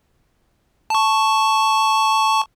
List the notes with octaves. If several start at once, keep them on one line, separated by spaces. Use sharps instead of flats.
A5 C#6